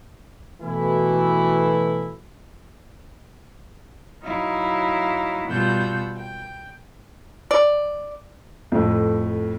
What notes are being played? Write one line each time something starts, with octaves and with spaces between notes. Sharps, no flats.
B2 E3 A3 E4
F#3 D#4 E4 F5
B2 G3 F4 F#5 E6 G6
G5
D5
F2 A2